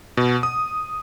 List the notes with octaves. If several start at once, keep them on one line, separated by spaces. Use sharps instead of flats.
B2
D#6